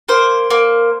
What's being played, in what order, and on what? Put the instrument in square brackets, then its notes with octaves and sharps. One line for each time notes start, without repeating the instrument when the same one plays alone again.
[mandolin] A#3 C5
A#3